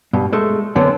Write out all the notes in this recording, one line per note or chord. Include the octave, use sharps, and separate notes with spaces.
G2 B2
G#3 A3
F#2 D3 B3 C4